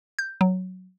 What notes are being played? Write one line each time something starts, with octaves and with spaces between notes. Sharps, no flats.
G6
F#3